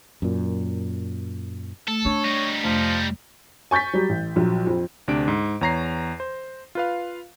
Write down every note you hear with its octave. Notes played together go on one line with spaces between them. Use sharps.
F#2 A#2
A3 A4
D4 C#5
G3 D#4
F2 C3 F3 A3
G#5 C#6 G6 A6 B6
F#3 G3
A1
A#1 F#3
F2
D2 C3 D4 D7
G#2
E2 C#5 A#5 A#6 C7
C5
F4 B4 F5